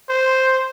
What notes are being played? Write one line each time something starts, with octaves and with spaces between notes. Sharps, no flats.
C5